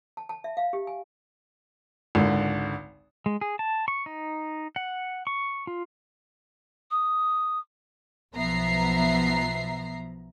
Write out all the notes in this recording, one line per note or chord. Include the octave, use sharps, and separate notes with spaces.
A5
A5
E5
F5
G4
G#5
G#1 C#2 D3
G#3
G#4
A5
C#6
D#4
F#5
C#6
F4
D#6
B1 F3 B3 E5 A#5 C7